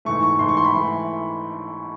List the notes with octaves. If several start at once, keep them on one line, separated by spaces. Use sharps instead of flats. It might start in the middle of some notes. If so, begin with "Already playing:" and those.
G#2 E3 A3 C#6
C#6
G#2 E3 A3 C6
C#6
C6
B5
G#2 E3 A3